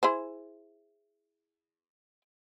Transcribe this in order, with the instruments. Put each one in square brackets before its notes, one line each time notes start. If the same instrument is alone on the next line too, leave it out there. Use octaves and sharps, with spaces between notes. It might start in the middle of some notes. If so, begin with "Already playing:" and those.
[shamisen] E4 G#4 C5